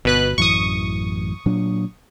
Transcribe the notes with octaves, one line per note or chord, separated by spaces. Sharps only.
G1 B2 B4 F#6
A1 F#2 E3 C#6 D#6
A#2 F#3 D4